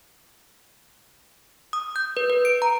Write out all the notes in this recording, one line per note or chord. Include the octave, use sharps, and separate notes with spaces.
D#6
G6
B4
B4
D7
A#5